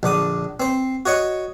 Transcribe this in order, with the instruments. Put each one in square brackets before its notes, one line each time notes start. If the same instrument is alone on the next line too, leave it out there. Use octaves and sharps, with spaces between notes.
[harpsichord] A#1 D3 D6 D#6
C4 C5
F#4 C#5 D#5 C#6